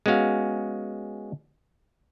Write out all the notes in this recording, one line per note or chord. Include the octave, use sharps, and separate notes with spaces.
G#3 B3 C#4 F#4 F5